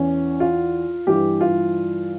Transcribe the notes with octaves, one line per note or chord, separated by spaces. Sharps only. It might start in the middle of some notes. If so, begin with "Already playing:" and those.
Already playing: E2 E3 C#4
F4
G2 E3 G4
F4